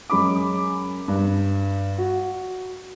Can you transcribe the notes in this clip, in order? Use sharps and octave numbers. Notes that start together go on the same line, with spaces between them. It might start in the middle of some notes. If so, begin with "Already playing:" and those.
F#2 G#3 C#4 B5 D6
G2
F#4